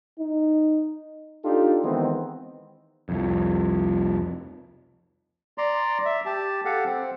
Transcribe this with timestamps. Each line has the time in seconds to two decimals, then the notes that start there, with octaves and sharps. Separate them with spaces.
0.19 D#4
1.44 D4 D#4 F4 G4 A4
1.83 D#3 E3 G#3 B3 C4
3.09 C2 F2
5.58 D5 A#5 C6
6.06 E5
6.26 G4 A5
6.65 G4 A4 F5 F#5
6.85 C4